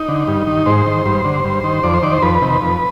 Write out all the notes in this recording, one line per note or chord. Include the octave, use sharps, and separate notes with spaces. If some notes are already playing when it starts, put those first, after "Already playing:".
Already playing: D#4
D3
G2
D#3
G#2 C5
D#3
G2
D3
G2
D#3
F2 D5
C5
D#3 D5
C5
F2 B4
C3 D#3
F2